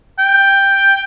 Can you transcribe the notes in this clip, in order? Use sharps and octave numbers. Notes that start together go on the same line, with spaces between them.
G5